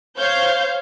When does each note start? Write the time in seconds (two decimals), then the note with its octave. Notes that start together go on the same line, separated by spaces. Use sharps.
0.17 C5 C#5 F5 G6